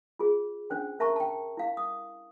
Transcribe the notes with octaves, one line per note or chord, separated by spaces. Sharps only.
F4 G#4
C#4 D4 C5 G5
A#4 C5 E5 A5 A#5 C#6
G5 A5
E4 F5
D#6